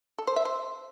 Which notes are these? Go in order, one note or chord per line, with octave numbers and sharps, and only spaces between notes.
A4
C5
E5
C5